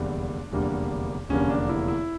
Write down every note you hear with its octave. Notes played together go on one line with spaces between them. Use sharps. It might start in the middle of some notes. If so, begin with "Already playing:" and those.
Already playing: F1 E2 D3 G3 A#3 D4
F1 E2 D3 G3 A#3
F1 E2 D3 G3 A#3 C#4
D4
E4
E4